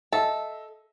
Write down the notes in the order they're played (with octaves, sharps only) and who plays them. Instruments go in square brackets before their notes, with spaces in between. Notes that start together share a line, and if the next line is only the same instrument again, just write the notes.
[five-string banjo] A4 [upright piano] D#5 E5